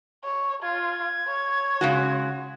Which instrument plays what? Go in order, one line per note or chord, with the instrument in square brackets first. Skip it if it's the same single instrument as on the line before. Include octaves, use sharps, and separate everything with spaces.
[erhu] C#5
[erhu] F4 [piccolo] G#6
[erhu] C#5
[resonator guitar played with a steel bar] C#3 G#3 F#4